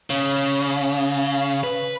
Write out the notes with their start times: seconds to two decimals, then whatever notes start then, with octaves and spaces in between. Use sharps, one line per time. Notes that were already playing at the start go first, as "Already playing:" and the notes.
0.10 C#3
1.63 B4